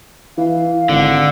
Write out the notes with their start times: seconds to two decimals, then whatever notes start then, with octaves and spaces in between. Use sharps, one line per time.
0.38 E3 F5
0.89 G#1 D3